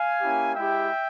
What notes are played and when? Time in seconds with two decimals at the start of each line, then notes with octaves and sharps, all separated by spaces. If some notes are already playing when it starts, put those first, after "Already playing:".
Already playing: F5 G#5
0.20 A#3 C#4 E4 G4
0.55 G#3 E4 G4 E5 G5